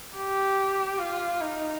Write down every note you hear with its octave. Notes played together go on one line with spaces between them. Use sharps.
G4
F4
D#4